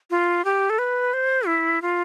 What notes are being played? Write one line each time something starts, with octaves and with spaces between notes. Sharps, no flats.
F4
G4
A4
B4
C5
E4
F4